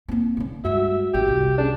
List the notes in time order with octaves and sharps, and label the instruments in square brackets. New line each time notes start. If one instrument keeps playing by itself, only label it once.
[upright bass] A#3 C4
D3 C#4
[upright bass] G2 G#3 [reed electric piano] F#4 [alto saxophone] E5
[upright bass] G#1 E3 [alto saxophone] G4
[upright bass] C2
[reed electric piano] C#4 G#4 D5 [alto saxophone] D4